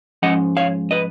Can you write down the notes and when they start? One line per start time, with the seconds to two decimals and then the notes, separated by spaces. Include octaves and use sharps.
0.22 G#2 F3 G#3 C#4 D#5 F#5
0.57 C#5 F5
0.91 B4 D#5